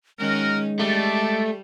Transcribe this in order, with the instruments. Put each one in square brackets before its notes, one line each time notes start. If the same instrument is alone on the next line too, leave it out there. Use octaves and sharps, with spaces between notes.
[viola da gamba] D#3 C#4 D#4 [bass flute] G#3 [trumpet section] F#4 A#4
[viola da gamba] G3 [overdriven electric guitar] A3 [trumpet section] D5 A5 D6